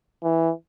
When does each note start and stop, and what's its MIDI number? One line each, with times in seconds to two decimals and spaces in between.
0.23 0.52 52